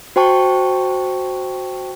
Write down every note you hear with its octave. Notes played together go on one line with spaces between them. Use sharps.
F#4 C5 G5 A5 C#6